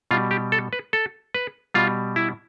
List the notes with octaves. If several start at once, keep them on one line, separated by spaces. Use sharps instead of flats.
B2 G3 F4
G4
A4
B4
A4
B4
B2 G3 F4
E4